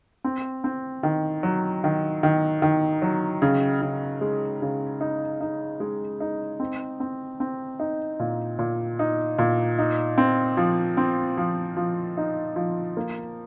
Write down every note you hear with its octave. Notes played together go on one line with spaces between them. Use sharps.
C4
C4
D#3
F#3
D#3
D#3
D#3
F#3
C#3
C#3
G#3
C#3
D#4
D#4
G#3
D#4
C4
C4
C4
D#4
A#2
A#2
D#4
A#2
D#4
C4
F3
C4
F3
F3
D#4
F3
A#3